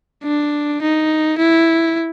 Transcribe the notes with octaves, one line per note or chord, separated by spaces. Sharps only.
D4
D#4
E4